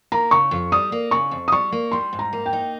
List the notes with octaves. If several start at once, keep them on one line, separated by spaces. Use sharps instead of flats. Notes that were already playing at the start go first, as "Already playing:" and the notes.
A#3 A#5
C#3 C#6
F2
G3 D#6
A#3
C#3 C#6
F2
D#6
G3 C#6
A#3
G3 C6
G#2
A#5
A#3
G5
D#4